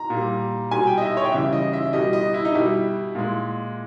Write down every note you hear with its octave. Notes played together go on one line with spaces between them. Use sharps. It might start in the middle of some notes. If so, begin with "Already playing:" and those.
Already playing: A#5
A#2 G3
B2 G3 G#5
G5
D#5
E5
C#5
G5
C#3 E3 G3 E5
D#5
E5
B2 G3 D#5
D#5
E4
D#4
B2 G3 E4
A#2 G#3